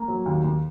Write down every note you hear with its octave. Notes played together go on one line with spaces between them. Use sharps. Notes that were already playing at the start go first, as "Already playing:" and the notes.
Already playing: A#3
F#3
D#2
D#2